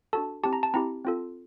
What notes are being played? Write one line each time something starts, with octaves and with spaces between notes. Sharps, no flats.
D4 F#4 A4 A5
C4 E4 G4 A5
A#5
A5
C4 E4 G4 A#5
C4 F4 A4